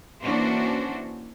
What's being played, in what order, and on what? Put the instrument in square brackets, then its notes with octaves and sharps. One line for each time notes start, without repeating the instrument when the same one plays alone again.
[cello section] E3 A#3 C#4 D4 F#4 C5